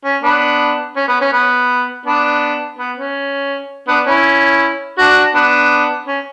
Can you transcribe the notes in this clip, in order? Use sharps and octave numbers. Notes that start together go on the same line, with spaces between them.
C#4
B3 D4
C#4
B3
C#4
B3
B3 D4
B3
C#4
B3 D4
C#4 E4
D4 F#4
B3 D4
C#4